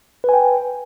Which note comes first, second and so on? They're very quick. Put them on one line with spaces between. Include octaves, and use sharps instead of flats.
B4 G#5 G5